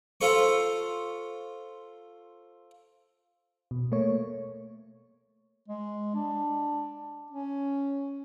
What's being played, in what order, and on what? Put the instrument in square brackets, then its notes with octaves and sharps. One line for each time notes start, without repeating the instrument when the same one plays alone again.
[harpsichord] F4 A4 C5 B5 C#6
[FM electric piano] B2
A3 A#3 C#5
[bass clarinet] G#3
D4
C#4